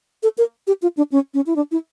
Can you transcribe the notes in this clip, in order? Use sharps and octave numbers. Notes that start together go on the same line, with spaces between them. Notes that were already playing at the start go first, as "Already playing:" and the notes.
A4
A#4
G4
F4
D4
C#4
C#4
E4
D4
E4